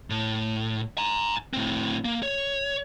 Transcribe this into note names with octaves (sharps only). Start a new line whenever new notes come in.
A2
G#5 A#5
A2 C4
A#3
C#5